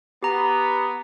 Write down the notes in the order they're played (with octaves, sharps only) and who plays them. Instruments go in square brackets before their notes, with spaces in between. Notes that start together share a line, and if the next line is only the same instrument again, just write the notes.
[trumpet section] B3 [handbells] G4 A#5